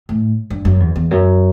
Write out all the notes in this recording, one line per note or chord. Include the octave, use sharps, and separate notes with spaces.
A2
G2
F#2
E2
E2
F#2